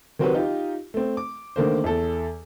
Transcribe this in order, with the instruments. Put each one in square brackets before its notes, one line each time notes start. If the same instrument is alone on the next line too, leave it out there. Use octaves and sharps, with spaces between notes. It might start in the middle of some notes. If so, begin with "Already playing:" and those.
[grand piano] D#3 F#3 C4 F#4 G4 B4
D#4 F4 G4
A3 C4
D6
D3 D#3 A3 A#3 A#4 C5
E2 A4